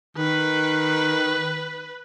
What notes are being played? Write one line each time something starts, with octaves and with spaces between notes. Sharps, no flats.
D#3 B4